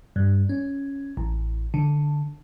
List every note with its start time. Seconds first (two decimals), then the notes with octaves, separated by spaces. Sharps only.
0.16 G2
0.49 C#4
1.17 A1
1.74 D3